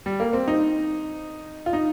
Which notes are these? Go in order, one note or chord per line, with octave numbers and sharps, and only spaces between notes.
G3
A#3
C4
D#4
F4
D#4